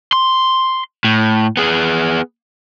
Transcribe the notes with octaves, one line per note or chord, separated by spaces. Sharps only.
C6
A2
B3 G#4